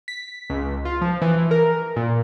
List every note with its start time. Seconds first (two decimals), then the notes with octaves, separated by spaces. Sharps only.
0.08 B6
0.50 C#2
0.85 F4
1.01 F3
1.22 E3
1.51 A#4
1.96 A#2